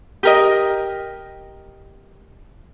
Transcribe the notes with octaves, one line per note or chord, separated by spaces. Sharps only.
G4 A#4 D#5